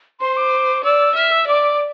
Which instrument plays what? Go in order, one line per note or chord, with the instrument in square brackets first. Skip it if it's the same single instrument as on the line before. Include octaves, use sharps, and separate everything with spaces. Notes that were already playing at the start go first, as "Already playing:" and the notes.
[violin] C5 [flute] C6
[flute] D6
[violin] D5 [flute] E6
[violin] E5 [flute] F6
[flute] E6
[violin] D5 [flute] D6